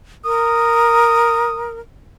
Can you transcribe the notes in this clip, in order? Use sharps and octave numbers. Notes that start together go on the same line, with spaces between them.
A#4 D#6